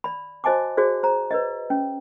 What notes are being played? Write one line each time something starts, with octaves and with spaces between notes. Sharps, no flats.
D5 B5
F#4 C5 D#5 G#5 A5 D6
F#4 G#4 C5 D5
C5 A#5
B4 D5 D#5
C#4